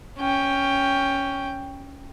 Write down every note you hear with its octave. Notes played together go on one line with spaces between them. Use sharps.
C#4 G5